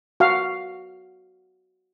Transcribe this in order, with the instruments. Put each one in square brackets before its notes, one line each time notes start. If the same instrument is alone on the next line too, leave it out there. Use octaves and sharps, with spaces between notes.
[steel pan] F#4 F5